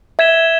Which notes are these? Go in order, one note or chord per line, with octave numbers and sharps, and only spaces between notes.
E5 G#6 B6 E7 G7